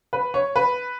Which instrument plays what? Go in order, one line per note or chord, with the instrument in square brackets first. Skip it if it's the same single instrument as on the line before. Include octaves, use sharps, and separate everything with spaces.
[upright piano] B4
C#5
B4